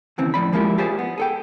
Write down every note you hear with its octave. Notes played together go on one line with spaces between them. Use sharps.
D#2 C#3 E3 C4
A2 F3 D5 B5
F3 G#3 A#3 E4 F4 G4
F4 G4 G#4 C5 D5
B3
G#4 A4 G5